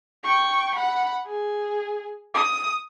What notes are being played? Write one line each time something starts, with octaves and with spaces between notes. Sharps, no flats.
G5 C#6
F#5 B5
G#4
D#6